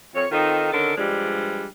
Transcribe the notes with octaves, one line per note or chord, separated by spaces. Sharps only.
F2 C#5
D#3 C4 D#4 F4 A4
D3 D#3 C#4 A4 A#4
G2 F3 G3 G#3 D4